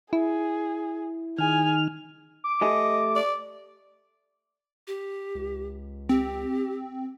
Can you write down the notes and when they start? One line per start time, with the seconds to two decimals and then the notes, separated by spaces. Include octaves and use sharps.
0.13 E4 G#4
1.38 D#3 G#4 G#5 F6
2.44 D6
2.61 A3 G4 D#5 G#5
3.15 D5
4.87 G4
5.35 C#2
6.09 C4 G4